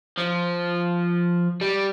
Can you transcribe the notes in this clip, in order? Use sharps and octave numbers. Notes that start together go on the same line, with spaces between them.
F3
G3